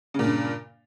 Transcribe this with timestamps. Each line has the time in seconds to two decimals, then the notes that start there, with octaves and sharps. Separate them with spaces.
0.14 C#3
0.19 A#2
0.24 G2